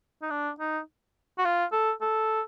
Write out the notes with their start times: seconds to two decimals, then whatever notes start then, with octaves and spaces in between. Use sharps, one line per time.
0.22 D#4
0.30 D4
0.60 D#4
1.38 F#4
1.45 F4
1.72 A4
2.01 A4